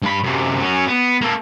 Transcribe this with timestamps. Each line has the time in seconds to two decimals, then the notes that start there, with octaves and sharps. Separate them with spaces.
0.02 G2 B5
0.24 F#2 C3
0.60 F#3 C#4
0.88 B3
1.21 A#3 A4